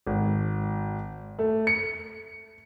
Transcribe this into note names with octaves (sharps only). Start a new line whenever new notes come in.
G#1
A3
C#7